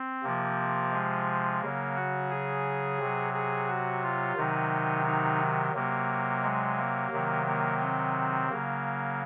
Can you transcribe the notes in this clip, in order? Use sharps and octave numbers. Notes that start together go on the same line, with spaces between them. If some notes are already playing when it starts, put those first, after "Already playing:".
Already playing: C4
C3 F3 A#3
G#3
C#3 F#3 A#3
F#4
G#4
C3
F#3
G#4
F#4
F4
C3 D#3 F#3 D#4
D#4
C3 F#3 A#3
G#3
A#3
C3 D#3 F#3
A#3
C4
C#3 F#3 A#3